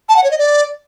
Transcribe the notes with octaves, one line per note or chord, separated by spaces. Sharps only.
A5
F#5
C#5
D#5
D5